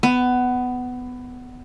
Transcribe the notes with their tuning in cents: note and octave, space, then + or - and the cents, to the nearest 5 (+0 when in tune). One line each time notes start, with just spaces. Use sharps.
B3 +15